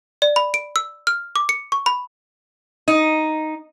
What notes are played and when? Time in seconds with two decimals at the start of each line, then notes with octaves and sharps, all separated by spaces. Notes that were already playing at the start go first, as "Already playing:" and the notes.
0.22 D5
0.36 B5
0.54 D7
0.76 E6
1.07 F6
1.36 D6
1.49 C#7
1.72 C#6
1.86 B5
2.88 D#4